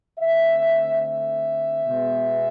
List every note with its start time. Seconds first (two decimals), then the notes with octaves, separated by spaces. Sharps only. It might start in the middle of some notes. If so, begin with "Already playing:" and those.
0.18 D3 A3 C4 E5
1.01 E5
1.84 B2 G#3 B3